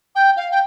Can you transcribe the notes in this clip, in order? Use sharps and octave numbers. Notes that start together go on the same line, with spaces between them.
G5
F5
G5